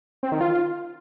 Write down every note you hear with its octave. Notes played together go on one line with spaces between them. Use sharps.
C4
D#3
F4